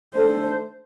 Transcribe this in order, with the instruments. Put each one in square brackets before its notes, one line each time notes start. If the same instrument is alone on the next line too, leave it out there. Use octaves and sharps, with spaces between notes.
[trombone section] A3 D4 A4 [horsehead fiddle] C5